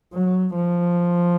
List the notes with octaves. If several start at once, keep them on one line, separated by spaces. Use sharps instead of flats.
F#3
F3